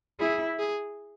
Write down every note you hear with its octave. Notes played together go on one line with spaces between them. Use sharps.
E4 G#4
G#4